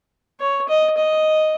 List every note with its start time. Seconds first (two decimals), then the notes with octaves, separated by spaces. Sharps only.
0.40 C#5
0.69 D#5
0.97 D#5